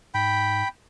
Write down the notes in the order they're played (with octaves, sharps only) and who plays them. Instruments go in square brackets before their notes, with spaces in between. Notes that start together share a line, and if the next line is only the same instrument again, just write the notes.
[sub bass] G#2 [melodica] G5 B5